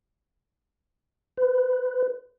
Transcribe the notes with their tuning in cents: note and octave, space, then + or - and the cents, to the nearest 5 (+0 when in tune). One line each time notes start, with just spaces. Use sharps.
B4 +25